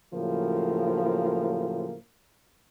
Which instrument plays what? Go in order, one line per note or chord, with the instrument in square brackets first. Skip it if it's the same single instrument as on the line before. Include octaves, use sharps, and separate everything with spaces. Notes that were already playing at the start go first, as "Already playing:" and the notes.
[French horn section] A2 C#3 F3 F#3 A#3